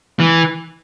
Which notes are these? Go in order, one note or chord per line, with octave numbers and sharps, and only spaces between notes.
E3